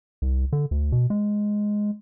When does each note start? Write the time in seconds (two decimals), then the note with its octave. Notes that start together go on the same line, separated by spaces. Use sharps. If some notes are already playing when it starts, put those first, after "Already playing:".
0.22 C2
0.53 D3
0.71 D2
0.92 B2
1.10 G#3